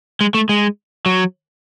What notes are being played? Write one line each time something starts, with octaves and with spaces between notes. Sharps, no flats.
G#3
A3
G#3
F#3